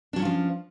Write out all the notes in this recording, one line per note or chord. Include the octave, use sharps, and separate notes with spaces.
F3 F#3 C#4 D4 F4